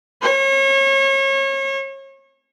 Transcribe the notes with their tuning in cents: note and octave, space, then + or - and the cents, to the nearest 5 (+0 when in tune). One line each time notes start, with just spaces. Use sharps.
C#5 -35